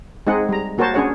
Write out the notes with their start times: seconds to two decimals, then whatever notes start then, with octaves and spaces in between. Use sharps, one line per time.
0.27 G#3 C4 D#4 G#4 F#5
0.49 G3 A#5
0.78 A#3 F#4 A#4 C5 C#5 A5
0.94 C#4 D4 G#4 C#5 F#5